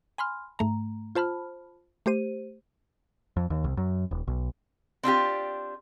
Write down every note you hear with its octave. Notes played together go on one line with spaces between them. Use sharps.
G#5 B5 C6 F6
G#2 A3 A#5
F4 C5 A5 B5 F6
A3 G4 C5 D#7
F2
D#2
C2
F#2
D#1
B1
C4 D4 F4 G4